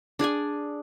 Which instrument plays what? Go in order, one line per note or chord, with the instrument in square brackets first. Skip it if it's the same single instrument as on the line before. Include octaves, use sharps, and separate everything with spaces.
[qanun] D4 G#4 D5 G#5